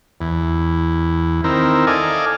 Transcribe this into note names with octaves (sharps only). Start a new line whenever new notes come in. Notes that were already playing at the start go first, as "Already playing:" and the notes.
E2
D#3 C4 E4 A#4
A4 D5 D#5 F5 G#5